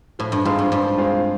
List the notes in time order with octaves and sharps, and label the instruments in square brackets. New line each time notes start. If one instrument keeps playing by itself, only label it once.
[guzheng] A2 [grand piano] F3
[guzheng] G2
[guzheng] G#2 [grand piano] G#3 C4 F4
[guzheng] G2
[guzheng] G2 [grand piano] F3
[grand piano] G#3 C4 F4